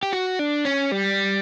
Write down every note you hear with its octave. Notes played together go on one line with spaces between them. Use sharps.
G4
F#4
D4
C#4
G3